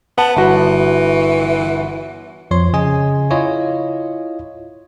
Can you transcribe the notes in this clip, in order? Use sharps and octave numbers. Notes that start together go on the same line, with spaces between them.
B3 F#5 A5
G1 E3 F#4
F2 F3 C#5 C6
C#3 G#4 D#5 G#5
E4 F4 C#5 D#5 F5